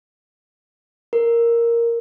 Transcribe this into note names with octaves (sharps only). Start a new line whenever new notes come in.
A#4